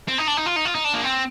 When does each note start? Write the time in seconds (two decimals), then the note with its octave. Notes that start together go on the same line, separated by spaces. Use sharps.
0.08 C4
0.18 D#4
0.28 D4
0.37 D#4
0.46 F4
0.56 D#4
0.65 F4
0.75 D#4
0.84 D4
0.94 A#3
1.04 C4